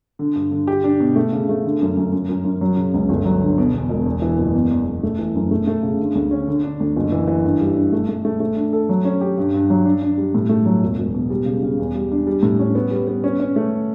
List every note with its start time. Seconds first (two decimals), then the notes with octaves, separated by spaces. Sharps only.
0.19 D3
0.35 G2
0.51 D3
0.67 G4
0.84 D4
1.00 B2
1.16 A3
1.33 C#3
1.49 A3
1.65 D3
1.81 F#2
1.97 F#2
2.12 F#2
2.29 F#2
2.45 F#2
2.61 F#3
2.77 C#3
2.94 C#2
3.09 G1
3.25 F#3
3.42 D3
3.58 B2
3.73 E2
3.89 E1
4.06 E2
4.22 E3
4.38 F#1
4.54 E2
4.71 E2
4.87 E2
5.03 A3
5.18 E3
5.35 F#2
5.51 A3
5.67 A3
5.83 C#3
5.99 D3
6.15 D2
6.31 C#4
6.48 D3
6.64 D4
6.80 D2
6.96 F#1
7.12 E3
7.27 E3
7.44 G2
7.61 G3
7.77 D4
7.93 A3
8.09 A3
8.25 A3
8.40 A3
8.56 D4
8.73 A4
8.89 F#3
9.05 C#4
9.21 G4
9.38 G2
9.54 G2
9.70 F#3
9.85 D4
10.02 D4
10.18 G3
10.35 A2
10.49 A3
10.66 F#3
10.83 E1
10.98 E1
11.14 B2
11.30 G3
11.46 C#3
11.63 C#3
11.79 E2
11.95 G3
12.12 D4
12.27 G3
12.43 A2
12.59 C#4
12.75 B3
12.91 G3
13.08 B3
13.24 C#4
13.40 C#4
13.56 A3